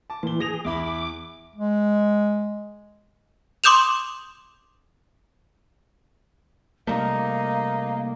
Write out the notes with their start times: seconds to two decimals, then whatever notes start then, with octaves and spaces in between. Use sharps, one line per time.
0.10 A5 D6
0.23 A#2 E3 G7
0.40 G#4 A#6 F7
0.65 E2 E4 B5 D6
1.56 G#3
3.64 C6 D6 D#6 G6 E7 F7
6.87 C3 G3 A3 A#3 D#4 F5